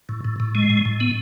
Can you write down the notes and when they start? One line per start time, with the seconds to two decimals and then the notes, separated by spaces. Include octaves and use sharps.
0.09 A2
0.25 A2
0.40 A2
0.55 G#3
0.70 A2
0.85 A2
1.00 B3